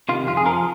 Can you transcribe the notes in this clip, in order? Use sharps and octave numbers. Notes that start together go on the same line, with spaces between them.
C3 D#3 F4
F2 F4
G#4
F3 A#4